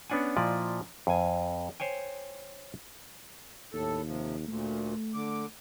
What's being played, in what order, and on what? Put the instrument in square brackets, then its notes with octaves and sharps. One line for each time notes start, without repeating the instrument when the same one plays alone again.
[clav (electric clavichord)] B3 C#4 D4 F#5 G#5
A#2 F3 E4 D5 D#5
F2 G#5
C5 C#5 G5 G#5
[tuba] D#2 [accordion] A2 A4
[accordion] C3 F3
[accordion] D2 A#2 [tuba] A3
[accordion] D3 D6